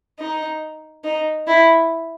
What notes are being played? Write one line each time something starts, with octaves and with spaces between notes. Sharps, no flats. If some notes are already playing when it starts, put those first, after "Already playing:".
D#4
D#4
E4